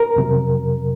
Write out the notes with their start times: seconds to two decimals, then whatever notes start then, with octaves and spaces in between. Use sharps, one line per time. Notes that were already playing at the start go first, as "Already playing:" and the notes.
Already playing: A#4
0.16 F2 C3 F#3